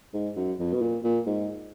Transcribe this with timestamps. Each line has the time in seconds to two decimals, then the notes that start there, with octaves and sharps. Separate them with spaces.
0.14 G#2
0.36 F#2
0.59 F2
0.73 B2
0.81 A#2
1.04 A#2
1.26 G#2